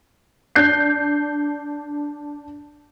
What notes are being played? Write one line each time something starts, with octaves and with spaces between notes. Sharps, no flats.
D4 G6 C7